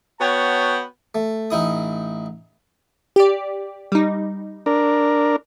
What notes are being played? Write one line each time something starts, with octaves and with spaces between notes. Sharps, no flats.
B3 F#4 C#5 G5 A5
A3
A1 D#4 E4 D#6
G4 D5
G3 D#4
D4 A#4